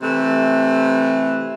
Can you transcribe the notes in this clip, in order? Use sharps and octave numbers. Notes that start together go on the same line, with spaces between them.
C3 E3 A3